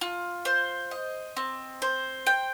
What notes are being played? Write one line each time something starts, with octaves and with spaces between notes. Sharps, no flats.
F4
C5
D#5
C4
C5
G5